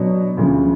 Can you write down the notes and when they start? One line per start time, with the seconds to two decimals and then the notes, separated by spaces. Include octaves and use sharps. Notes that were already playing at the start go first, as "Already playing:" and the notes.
Already playing: B2 F#3 B3 D4
0.37 D2 C#3 F3